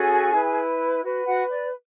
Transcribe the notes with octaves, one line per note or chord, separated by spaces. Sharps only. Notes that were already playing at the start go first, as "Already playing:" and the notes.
Already playing: C#4 F#4 G#4 A4 G#5
E4 B4
F#4 B4
F#4 F#5
D5